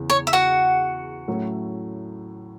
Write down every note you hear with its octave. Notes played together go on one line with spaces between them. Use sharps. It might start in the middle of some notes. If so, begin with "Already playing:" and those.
Already playing: E2 C#3 E3
C#5
E5
F#4 F#5
A2 F#3 A3 C#4 E4